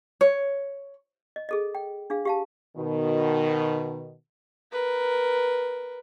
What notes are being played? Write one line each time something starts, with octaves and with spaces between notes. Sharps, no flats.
C#5
D#5
G#4 A4 D#5
G5
D4 G#4 F5
G4 F5 A5
B2 D#3
A#4 B4